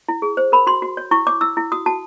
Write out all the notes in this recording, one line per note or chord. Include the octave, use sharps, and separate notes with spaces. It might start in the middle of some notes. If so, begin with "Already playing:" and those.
E4
G#4
C5
A#4 B5
F#4 C6
F#4
C#5
E4 C#6
C#5 D6
E4 E6
E4
F#4 D#6
F#4 A5